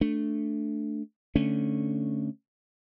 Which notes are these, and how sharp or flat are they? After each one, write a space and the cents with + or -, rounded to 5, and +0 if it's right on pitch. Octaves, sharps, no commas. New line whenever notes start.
A3 +0 D4 +0
D3 +0 A3 +0 C#4 -10